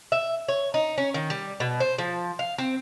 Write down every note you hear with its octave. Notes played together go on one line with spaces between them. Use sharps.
E5
C#5
D#4
C#4
D#3
G3
B2
C5
F3
F5
C4